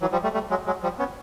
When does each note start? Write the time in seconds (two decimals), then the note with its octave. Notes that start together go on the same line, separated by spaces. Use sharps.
0.01 E3 F#3
0.12 F3 G3
0.23 G3 A3
0.34 G3 A3
0.50 F#3 G#3
0.66 F#3 G#3
0.83 F3 G3
0.99 B3 C#4